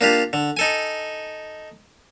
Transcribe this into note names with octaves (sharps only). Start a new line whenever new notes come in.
A#3 D4 F4 G4
D3
D#4 A4 G#5